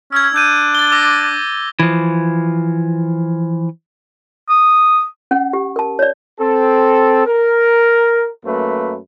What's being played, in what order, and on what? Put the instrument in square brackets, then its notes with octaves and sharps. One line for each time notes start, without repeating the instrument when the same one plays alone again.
[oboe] C#4 [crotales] E6 G#6
[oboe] D4 [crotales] E6 G6 D#7
[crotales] A6 G7
D6 E6 A#6
[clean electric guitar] E3 F3
[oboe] D#6
[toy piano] C#4 F#5
G4
A#4 A5
C#5 D5
[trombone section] C4 A4
A#4
F#2 A3 A#3 B4